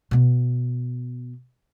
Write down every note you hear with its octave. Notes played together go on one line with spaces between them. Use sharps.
B2 B3